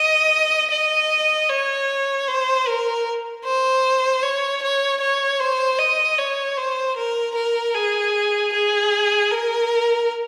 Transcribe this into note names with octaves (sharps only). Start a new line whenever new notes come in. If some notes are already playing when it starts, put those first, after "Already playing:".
Already playing: D#5
D#5
C#5
C5
A#4
C5
C#5
C#5
C#5
C5
D#5
C#5
C5
A#4
A#4
G#4
G#4
A#4